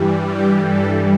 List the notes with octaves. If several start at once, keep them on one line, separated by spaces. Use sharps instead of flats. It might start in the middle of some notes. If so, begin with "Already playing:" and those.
Already playing: G2 E3 G3
G4
A4